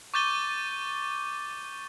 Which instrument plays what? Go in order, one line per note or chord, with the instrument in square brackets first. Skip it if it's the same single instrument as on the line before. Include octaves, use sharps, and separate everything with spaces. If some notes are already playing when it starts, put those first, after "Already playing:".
[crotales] C#6 D6 G6 A6 D#7 G7